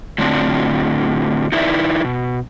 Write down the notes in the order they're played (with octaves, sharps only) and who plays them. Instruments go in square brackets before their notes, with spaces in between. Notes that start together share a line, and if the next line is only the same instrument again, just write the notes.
[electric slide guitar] A2 D3 F#3 C4 D4 F4
D#4 E4 B4 D5 E5
B2